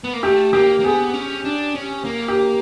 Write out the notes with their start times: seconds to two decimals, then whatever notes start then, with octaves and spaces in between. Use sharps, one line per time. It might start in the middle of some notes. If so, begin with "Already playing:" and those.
0.04 B3
0.13 A#3
0.23 A3 G4
0.53 A#3 G4
0.79 A#3
0.83 B3 G#4
1.13 C#4
1.45 D4
1.75 C#4
2.05 A#3
2.28 G4